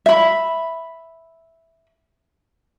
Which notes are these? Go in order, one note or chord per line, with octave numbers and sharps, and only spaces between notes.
E5 B5